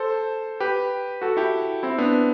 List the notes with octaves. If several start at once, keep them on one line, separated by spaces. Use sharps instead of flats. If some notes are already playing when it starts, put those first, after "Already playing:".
Already playing: A4 C5
G4 B4
F#4 A4
E4 G4
C4 E4
B3 D4